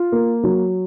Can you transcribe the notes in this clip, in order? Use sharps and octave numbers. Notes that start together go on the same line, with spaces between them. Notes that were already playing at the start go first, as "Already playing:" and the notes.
Already playing: F4
A#3
F#3